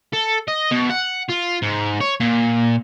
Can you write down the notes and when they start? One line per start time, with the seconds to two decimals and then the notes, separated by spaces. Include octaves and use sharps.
0.13 A4
0.48 D#5
0.71 B2
0.90 F#5
1.29 F4
1.62 G#2
2.01 C#5
2.20 A#2